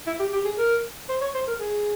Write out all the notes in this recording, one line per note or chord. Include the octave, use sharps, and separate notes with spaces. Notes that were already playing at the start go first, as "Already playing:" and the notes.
E4
G4
G4
G#4
A#4
C5
C#5
C5
A#4
G#4